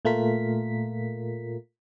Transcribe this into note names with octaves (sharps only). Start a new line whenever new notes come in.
A#2 A3 F4 A#4 B6